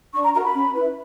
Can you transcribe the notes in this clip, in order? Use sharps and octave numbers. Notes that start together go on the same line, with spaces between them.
D4 C#6
A#5
F#4 A#4 A#5
B5
C#4
E4 B4